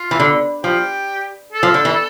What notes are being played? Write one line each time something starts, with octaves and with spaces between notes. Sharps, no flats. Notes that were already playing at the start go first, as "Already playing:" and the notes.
Already playing: F4
E3
D3
F3 G4
A4
F3
D3
E3